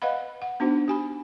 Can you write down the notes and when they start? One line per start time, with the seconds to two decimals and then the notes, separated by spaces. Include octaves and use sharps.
0.02 B4 D#5 F5 F#5 B5
0.42 F#5
0.60 B3 D4 D#4 F#4 C5
0.88 G4 G#5 B5